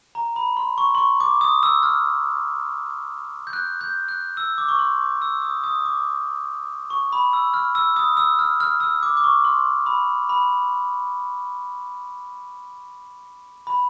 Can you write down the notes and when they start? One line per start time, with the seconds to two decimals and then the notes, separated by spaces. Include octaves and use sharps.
0.15 A#5
0.36 B5
0.57 C6
0.78 C#6
0.95 C6
0.98 C#6
1.20 D6
1.41 D#6
1.63 E6
1.83 F6
3.47 G6
3.53 F#6
3.81 G6
4.08 F#6
4.37 E6
4.58 D6
4.68 C#6
4.79 C6
5.01 D6
5.22 E6
5.42 D#6
5.64 D#6
5.85 D6
6.90 C#6
7.13 B5
7.33 E6
7.54 F6
7.75 E6
7.96 D#6
8.17 E6
8.39 F6
8.60 F6
8.80 E6
9.03 D6
9.17 D6
9.24 C#6
9.44 C6
9.86 B5
10.29 B5
13.67 B5